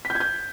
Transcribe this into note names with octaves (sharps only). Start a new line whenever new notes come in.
B6
G6
G#6
G6